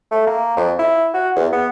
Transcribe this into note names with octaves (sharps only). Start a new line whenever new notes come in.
A3
A#3
F2
E4
F#4
E2
B3